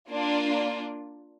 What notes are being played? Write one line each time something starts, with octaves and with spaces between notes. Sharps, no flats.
A#3 D4 F4